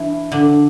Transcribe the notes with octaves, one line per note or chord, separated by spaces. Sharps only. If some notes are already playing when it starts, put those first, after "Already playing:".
Already playing: E3 D4 E4
D3 D4